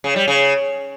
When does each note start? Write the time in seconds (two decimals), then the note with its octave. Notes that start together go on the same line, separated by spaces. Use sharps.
0.04 C#3
0.16 G3
0.28 C#3